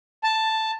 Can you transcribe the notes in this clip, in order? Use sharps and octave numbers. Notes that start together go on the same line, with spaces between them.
A5